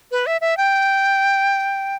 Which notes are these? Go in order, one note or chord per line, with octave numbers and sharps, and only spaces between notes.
B4
E5
E5
G5